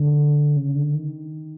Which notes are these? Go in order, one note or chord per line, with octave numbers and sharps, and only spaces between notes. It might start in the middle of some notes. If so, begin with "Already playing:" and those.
Already playing: D3
C#3
D3
D#3